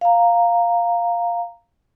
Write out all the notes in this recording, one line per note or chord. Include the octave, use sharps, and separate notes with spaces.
F5 A#5